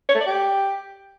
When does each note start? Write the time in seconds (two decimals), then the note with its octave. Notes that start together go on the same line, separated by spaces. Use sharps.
0.09 C#5
0.15 A3
0.20 D5
0.26 G4